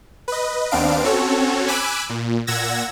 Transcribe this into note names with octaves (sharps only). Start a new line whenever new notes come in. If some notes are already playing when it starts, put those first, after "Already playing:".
B4 D#5
D#2 B3 C4 D4 F5 D7
C4 C#4 F#4 A4 C#5
G#5 B5 D6 E6 F#6
A#2
A#2 F#5 E6 G#6 A#6